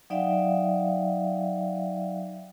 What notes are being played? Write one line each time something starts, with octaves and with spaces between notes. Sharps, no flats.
F#3 D#4 D5 E5 F5 G5